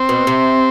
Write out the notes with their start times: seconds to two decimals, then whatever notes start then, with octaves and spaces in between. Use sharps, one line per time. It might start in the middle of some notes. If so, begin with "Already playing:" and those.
Already playing: C4
0.09 B2
0.27 C3